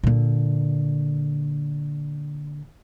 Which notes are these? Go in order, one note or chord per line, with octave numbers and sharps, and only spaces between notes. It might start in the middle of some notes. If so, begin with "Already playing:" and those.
A#2 D3